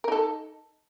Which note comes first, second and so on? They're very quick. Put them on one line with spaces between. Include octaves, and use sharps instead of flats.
A#4 D#4 A4